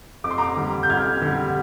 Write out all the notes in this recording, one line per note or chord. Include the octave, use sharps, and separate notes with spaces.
F2 D6
C6
A#5 D6
D3 G3
G6
F2 F6 G#6
D3 G3